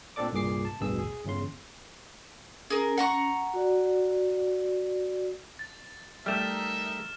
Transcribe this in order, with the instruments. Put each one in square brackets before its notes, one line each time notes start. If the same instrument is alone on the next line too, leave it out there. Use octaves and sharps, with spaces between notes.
[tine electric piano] A#2 C4 D4 A4 D5 D6
C2 G2 A#2 G#4 D6 C7
A5
A1 D2 G2 B2 G#4 E6
G#4
G1 E2 C#3 C6
[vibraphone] C#4 [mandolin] G#4 A#4
[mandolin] F#5 A#5 C#6
[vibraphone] F#4 D5
[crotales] A6
[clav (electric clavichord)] G3 A3 [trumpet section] D#4 A#4 E5 [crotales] F6 E7